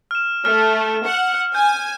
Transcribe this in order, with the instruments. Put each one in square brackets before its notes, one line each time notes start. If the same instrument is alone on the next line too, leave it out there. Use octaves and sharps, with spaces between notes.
[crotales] F6 E7
[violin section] A3 [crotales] F6
[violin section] F#5
[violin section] G#5 [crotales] G6